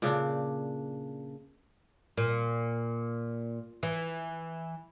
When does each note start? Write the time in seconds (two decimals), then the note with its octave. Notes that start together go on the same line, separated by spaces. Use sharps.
0.02 A#2 C#3 D4
2.18 A#2
3.83 E3